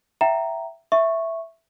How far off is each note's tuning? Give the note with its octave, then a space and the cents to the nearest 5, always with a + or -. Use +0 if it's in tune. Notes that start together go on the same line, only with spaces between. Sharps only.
E5 +10 G5 -35 A#5 +0
E5 +0 C#6 -10